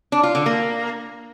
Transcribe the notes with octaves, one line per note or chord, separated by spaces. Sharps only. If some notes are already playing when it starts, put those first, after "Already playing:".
D4
F4
D3
A#3